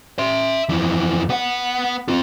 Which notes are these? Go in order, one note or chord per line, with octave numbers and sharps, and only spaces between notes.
E5 C6
F2 E3
B3 F#5
C4 F4